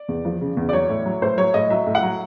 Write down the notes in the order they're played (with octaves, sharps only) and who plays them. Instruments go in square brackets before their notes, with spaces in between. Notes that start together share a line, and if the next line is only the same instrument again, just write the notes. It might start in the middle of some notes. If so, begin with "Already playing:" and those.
Already playing: [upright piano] D5
E2
F3
C#3
E2
D5
F#3 C#5
A2
F#3
A2 C5
F#3 C#5
A2 D#5
F#3 E5
A2
F#5
F#3